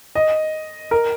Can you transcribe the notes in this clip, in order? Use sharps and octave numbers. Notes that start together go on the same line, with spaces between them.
D#5
A#4